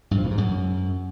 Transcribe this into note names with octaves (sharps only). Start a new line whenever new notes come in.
G2
F3
B2
G#2
F#2